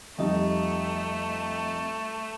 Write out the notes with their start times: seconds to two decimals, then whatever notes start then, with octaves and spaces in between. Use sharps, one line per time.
0.19 F2 G3 A3 D#4 G4